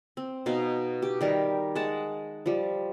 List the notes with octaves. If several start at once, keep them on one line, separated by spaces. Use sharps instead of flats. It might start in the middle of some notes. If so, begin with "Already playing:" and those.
C4
B2 D#4 F5
G4
D#3 G3 A#4
G#3 F#5 A5
F3 G3